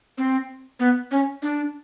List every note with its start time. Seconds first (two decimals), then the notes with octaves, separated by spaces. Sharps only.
0.18 C4
0.80 B3
1.11 C#4
1.42 D4